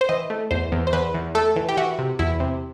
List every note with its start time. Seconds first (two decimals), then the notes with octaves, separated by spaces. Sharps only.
0.01 C5
0.09 E3 D#5
0.30 A3
0.51 E2 C5
0.72 E2
0.87 C5
0.93 E2 B4
1.14 E2
1.35 A3 A4
1.56 E3
1.69 G4
1.77 E3 F#4
1.99 C3
2.19 E2 E4
2.40 C3